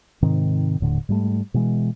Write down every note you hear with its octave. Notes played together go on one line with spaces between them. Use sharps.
G#2 C3 D#3 C4
D#1 A2 D3
G#2 G3 A3
B2 E3 G#3